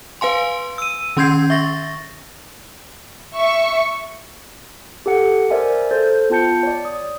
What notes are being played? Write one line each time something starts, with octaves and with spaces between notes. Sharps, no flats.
B4 F5 G#5 C6
E6 D#7
D#3 C#4 C6 G6 G#6 C7
E5 C#6 A6 A#6
E5 C#6
G4 A4 F#5 C#7
A#4 C5 D5 E5 G#5
A4 C5 G6 A6
B3 F4 G5 A5 G6 C#7
C#5 D5
D#6